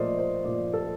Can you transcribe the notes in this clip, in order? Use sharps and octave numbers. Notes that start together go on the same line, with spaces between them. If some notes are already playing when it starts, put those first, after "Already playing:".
Already playing: A#2 F3 A3 A#4 C5 D5 D#5
C5
A#2 F3 A3 D5
A4